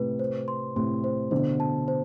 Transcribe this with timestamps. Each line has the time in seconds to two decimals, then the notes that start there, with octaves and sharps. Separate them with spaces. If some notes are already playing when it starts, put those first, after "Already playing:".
Already playing: A2 C3 B4
0.19 C5
0.48 C6
0.76 A2 C3 C6
1.04 C5
1.31 B2 D3 C5
1.60 A5
1.88 C5